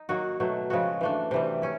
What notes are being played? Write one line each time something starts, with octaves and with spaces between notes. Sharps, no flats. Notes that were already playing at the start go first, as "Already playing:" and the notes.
Already playing: D#4
D#3 F#3 A#3 F#4
B2 F#3 A3
C#3 F3 G#3 F#4
E3 A3 D4
C3 E3 G3
C#4 E4